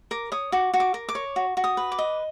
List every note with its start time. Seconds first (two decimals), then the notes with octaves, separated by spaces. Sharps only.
0.11 A#4 D6
0.32 C#5 D#6
0.52 F#4 D6
0.74 F#4
0.80 D6
0.94 A#4
1.09 D6
1.15 C#5
1.36 F#4
1.57 F#4
1.64 D#6
1.77 B4
1.92 D6
1.99 D#5